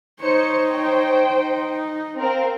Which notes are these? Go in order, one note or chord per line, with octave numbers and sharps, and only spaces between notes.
D#4 C5 C#5 C#7
C5 G5
D#4
C4 A#4 F5